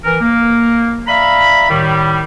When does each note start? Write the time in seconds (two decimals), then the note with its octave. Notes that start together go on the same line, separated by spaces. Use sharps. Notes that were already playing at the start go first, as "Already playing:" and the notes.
0.05 E3 A#4
0.21 A#3
1.07 D5 E5 F5 A#5 B5
1.69 A2 D#3 G3